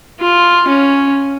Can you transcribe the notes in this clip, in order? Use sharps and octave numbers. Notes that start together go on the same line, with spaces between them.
F4
C#4